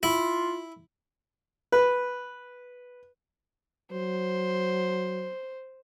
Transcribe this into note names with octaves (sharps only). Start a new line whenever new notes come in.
E4 F4
B4
F#3 C5